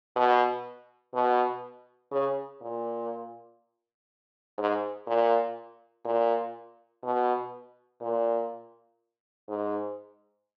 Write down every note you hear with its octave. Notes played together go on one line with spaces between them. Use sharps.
B2
B2
C#3
A#2
G#2
A#2
A#2
B2
A#2
G#2